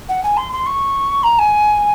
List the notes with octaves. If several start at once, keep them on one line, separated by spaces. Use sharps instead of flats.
F#5
G#5
C6
C6
C#6
A#5
G#5